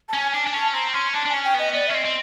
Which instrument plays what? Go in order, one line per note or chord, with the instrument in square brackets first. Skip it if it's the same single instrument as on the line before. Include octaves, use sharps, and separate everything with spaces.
[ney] A5
[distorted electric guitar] C#4 [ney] G#5
[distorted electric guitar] D4 [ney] G#5
[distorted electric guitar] D4
[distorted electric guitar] C#4 [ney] A5
[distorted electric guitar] C4 [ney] A#5
[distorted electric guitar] C#4 [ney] C6
[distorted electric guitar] D4 [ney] A5
[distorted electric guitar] D4
[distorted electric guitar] C#4 [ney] G#5
[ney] G5
[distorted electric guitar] B3 [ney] D#5
[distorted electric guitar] B3 [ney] D5
[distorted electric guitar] C#4 [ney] E5
[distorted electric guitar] C4 [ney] D#5
[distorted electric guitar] C4